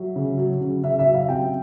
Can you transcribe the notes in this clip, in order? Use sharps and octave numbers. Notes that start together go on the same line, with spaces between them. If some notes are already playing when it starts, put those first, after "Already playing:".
Already playing: F#3 E5
C#3
F#3
C#3
C#3 E5
E5
F#3
F5
C3 G5